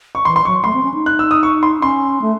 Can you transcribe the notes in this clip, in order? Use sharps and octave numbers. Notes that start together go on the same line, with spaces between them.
C#6
E3 C6
C6
F#3 C#6
A3 C6
C4
C#4
D#4
F#6
E6
D#6
C#6
C6
C#4 C6
A3